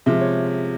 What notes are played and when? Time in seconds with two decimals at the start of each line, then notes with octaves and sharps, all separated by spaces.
0.06 C3 F3 G#3 E5
0.21 C#5